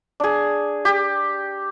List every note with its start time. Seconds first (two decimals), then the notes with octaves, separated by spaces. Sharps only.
0.20 D4 G#4
0.85 G4